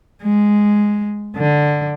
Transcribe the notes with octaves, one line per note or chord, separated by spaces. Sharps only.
G#3
D3